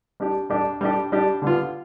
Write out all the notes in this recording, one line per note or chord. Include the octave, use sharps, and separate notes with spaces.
G3 D4 G4
G3 D4 G4
G3 D4 G4
G3 D4 G4
D3 G3 B3 F4